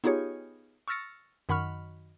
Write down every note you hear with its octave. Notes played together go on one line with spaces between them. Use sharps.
B3 D#4 F4 G4 G#4 C#5
C#6 E6 F6 A6 A#6 C#7
F#2 D#3 F#5 B5 C#6 F6